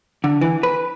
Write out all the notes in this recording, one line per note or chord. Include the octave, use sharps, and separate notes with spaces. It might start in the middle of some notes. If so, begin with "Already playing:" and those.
D3
E3
B4